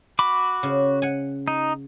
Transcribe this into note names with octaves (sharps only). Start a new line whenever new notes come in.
F#4 B5 D6
C#3
F#5 G#5
D#4